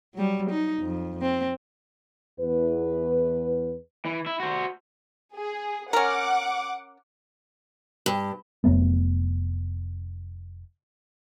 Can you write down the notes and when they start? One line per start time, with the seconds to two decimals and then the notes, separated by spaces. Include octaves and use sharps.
0.14 F#3 G3
0.50 D#4
0.80 F2
1.22 C4
2.40 E2 B4
4.05 E3
4.26 E4
4.40 F#4 C5
5.35 G#4
5.93 C#4 A#4 F#5 D6
8.06 G2
8.64 F1 F#3 A3 B3